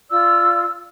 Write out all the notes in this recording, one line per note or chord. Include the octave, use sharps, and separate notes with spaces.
F4 D5 E6